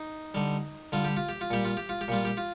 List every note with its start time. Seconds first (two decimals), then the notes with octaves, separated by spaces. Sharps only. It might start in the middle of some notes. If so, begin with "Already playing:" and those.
Already playing: D#4
0.34 D3 G3
0.92 D3 G3 F4
1.05 G4
1.17 F4
1.29 G4
1.41 F4
1.50 A#2 G3 G4
1.65 F4
1.77 G4
1.89 F4
2.01 G4
2.08 A#2 G3 F4
2.25 G4
2.37 F4